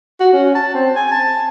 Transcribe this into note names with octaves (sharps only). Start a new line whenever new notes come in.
F#4
C#4
A5
C4
G#5
A5